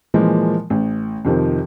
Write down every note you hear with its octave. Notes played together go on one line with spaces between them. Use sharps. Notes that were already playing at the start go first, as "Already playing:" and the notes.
A#2 E3 F3 G#3 A#3
A1
F2 C3 D#3 F3